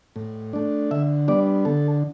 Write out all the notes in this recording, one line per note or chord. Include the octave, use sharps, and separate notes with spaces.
A2
A3 D4
D3 E5
G3 B3 D4 D5
D3 A4